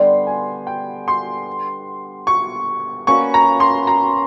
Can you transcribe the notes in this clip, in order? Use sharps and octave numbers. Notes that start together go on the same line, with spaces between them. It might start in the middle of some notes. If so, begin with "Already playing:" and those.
Already playing: D3 G3 B3 C6
G#5
G5
C6
C#6
A#3 C#4 F#4 B4 C#6
A#5
C6
A#5